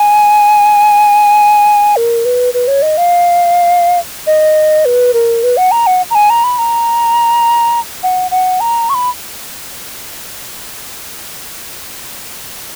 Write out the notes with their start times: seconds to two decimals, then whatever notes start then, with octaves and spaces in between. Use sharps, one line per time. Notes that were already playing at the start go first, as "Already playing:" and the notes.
Already playing: G#5
1.96 A#4
2.25 B4
2.54 B4
2.68 C#5
2.82 D#5
2.97 F5
4.27 D#5
4.85 B4
5.14 A#4
5.43 B4
5.57 F#5
5.71 A#5
5.87 F#5
6.10 A#5
6.15 G#5
6.30 A#5
6.44 B5
6.58 A#5
8.03 F#5
8.31 F#5
8.60 A#5
8.90 C#6
8.94 B5